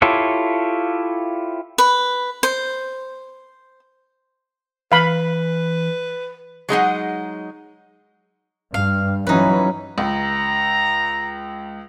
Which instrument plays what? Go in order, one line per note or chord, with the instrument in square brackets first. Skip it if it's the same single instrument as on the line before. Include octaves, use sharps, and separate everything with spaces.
[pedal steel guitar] E4 F4 G4 A4 C#5
[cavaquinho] B4
C5
[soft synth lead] E3 [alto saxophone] B4 [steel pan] F5 B5
[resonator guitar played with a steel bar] F#3 G#3 D#4 F#5
[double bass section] G2 [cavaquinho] F5
[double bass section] E3 F#3 C#4 [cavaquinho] D#4 B4
[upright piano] C#2 [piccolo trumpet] A#5